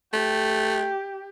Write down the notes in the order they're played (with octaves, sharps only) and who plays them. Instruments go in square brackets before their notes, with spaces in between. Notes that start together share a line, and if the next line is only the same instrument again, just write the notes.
[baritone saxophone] A3 [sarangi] G4